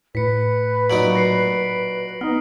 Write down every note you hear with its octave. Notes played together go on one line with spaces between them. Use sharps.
A2 B4 B6 C#7
A#2 F#3 D#4 D7 F#7
A#6 C7 C#7
B3 D#4 F6